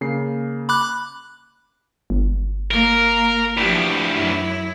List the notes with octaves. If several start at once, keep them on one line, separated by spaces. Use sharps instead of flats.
C#3 A#3 C7
B5 D6 F#6
G1
A#3 A#4
D2 E3 F3 G4
F#2 E4